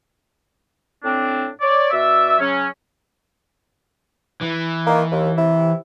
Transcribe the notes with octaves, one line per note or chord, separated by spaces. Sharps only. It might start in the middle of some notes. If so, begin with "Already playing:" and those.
A2 C4 D4
C#5 D5
B2 D5 E5
C#3 F#3 C#4
E3
D#3 A#3
D#2
C3 E4